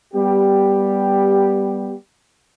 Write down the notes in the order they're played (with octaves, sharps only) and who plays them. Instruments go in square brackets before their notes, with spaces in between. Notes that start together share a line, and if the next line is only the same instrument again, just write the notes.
[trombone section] G3 B3 G4